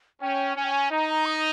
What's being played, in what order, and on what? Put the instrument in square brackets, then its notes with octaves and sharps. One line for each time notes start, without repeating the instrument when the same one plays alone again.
[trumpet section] C#4 [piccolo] G5
[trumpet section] C#4 [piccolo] G#5
[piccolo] G5
G#5
[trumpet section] D#4 [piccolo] A#5
[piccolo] A#5
D#6